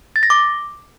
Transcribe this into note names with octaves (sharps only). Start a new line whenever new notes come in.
A6
A#6
D6